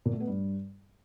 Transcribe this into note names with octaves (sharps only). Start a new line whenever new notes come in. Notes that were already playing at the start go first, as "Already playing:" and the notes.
A#2
A3
B3
G2